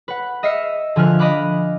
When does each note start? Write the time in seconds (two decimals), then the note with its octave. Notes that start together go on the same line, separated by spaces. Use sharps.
0.08 B4 F#5
0.43 D#5 E5 E6 F6 C7 C#7
0.96 D3 F3 G#5 F6 F#6
1.19 D#5 F5 B5 D6 F#6